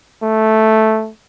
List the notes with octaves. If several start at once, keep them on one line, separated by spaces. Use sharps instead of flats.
A3